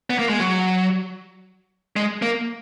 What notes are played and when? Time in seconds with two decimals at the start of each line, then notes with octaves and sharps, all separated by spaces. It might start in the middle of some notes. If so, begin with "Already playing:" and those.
0.10 B3
0.19 A#3
0.29 G#3
0.40 F#3
1.96 G#3
2.22 A#3